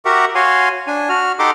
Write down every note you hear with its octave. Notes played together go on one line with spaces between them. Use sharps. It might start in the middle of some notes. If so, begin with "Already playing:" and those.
F#4 G4 A#4 E5 F#5
F#4 C#5 F5 G#5 C6
D4 G#5
F#4 F6
D#4 G4 A4 F#5 C6 D6